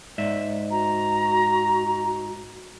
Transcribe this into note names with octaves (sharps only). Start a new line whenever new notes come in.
G#2 D5 E5
F#4 A#5